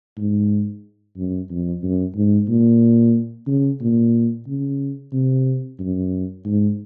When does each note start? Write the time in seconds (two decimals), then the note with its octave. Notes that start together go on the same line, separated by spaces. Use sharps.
0.17 G#2
1.17 F#2
1.50 F2
1.83 F#2
2.15 G#2
2.48 A#2
3.47 C#3
3.81 A#2
4.47 C#3
5.13 C3
5.79 F#2
6.45 G#2